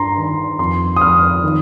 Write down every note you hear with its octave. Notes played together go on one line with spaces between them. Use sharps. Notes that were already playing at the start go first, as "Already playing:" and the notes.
Already playing: G2 A#5 C6
D#3
F2 C6
D#6
F2 F6
D#3